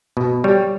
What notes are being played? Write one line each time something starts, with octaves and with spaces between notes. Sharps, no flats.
B2
G3 C#5